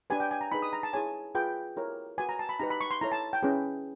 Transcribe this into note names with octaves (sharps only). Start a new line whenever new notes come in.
D4 G4 B4 G#5
G5
G#5
A#5
D#4 G#4 B4 B5
D#6
A#5
A5
E4 G#4 C#5 G#5
F4 G#4 B4 G5
E4 G4 A#4 C#5
F#4 B4 G#5
A#5
A5
B5
D#4 G4 B4 A#5
B5
C#6
C6
E4 A4 C#5 A#5
A5
G5
C#4 E4 G#4 B4